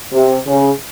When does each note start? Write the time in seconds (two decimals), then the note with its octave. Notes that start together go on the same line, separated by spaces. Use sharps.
0.13 C3
0.47 C#3